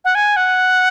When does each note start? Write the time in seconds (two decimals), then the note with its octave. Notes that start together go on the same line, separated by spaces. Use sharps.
0.05 F#5
0.15 G#5
0.36 F#5